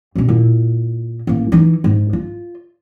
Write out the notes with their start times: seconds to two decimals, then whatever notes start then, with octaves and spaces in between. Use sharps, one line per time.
0.15 B2 C#4
0.28 A#2 E4
1.27 A1 A#3
1.52 E3 D#4
1.84 G#2
2.13 F4